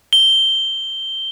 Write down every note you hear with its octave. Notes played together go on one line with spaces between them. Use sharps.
G7